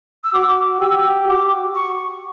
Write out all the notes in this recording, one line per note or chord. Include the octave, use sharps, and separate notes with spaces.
E6
F#4 D6
G4 E6
F#4 D6
C#6